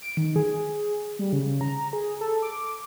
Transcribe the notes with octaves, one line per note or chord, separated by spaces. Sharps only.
D7
D#3
G#4
G3
C#3
A#5
G#4
A4
D6